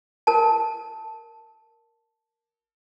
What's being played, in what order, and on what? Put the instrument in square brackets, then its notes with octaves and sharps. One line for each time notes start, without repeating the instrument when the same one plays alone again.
[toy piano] A#4 A5